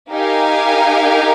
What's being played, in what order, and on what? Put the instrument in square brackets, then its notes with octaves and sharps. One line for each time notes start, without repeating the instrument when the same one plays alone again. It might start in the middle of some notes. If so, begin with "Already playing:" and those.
[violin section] D#4 G4 A#4 F5 G#5